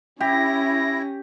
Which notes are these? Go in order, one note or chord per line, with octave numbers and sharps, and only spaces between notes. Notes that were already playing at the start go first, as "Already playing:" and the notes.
C#4 E4 G4 A#6